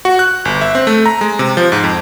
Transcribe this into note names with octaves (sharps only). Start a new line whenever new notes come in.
F#4
F#6
G1
E5
C4
A3
A#5
G#3
C3
F3
G#2
F2